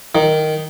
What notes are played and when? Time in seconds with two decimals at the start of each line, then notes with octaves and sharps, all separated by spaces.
0.15 D#3